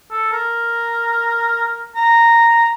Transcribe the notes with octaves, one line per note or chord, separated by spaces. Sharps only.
A4
A#4
A#5